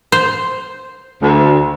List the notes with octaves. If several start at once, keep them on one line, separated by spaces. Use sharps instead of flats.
C5
D2